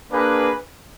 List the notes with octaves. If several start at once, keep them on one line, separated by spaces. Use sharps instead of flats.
A#3 D4 G#4 B4